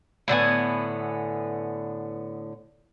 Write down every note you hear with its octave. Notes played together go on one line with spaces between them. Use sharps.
A2 D3 B3 G#5